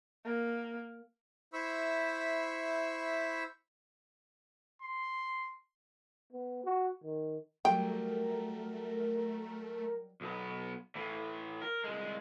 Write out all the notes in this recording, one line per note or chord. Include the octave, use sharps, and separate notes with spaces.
A#3
E4 C5 E5 B5 C#6 E6
C6
B3
F#4
D#3
F#3 G3 A3 A#4 G5
B1 B3
A2 E3
A#4
C2 G#3